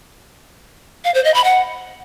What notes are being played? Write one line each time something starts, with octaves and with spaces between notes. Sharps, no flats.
F5
C5
D#5
B5
F#5